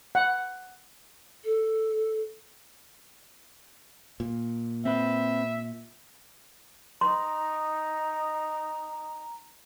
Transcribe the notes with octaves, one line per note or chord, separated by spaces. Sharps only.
F#5
A4
A#2
C4 B4 E5
D#4 A#5 C6